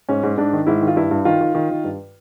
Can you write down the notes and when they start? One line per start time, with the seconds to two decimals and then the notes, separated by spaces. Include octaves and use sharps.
0.09 G#2 C#4
0.23 G#2
0.37 G#2 D4
0.53 D#3
0.67 G#2 E4
0.82 D#3
0.87 F4
0.96 G2 E4
1.11 G2
1.25 D#3 F4
1.41 D#3
1.55 D#3
1.70 D#3
1.84 G2